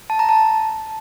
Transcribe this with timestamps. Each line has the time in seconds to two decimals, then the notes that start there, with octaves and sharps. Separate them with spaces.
0.10 A5
0.19 A#5
0.29 A5